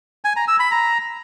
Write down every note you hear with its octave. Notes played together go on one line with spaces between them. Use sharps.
G#5
A#5
E6
B5
A#5